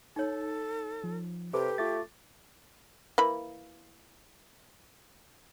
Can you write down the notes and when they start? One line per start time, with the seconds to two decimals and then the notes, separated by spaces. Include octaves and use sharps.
0.16 D#4 A4 C#5
1.04 F3
1.54 C3 G4 A4 B4 D6
1.78 A3 F4 D6 A6
3.18 E3 A#3 B5